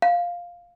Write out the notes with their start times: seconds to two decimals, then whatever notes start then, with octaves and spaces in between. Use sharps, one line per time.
0.02 F5